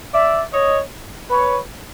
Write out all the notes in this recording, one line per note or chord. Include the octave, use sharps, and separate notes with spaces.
D5 E5
C#5 D#5
B4 C#5